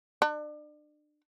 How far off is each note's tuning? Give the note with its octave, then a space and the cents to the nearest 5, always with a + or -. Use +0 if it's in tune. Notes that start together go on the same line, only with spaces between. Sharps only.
D4 +35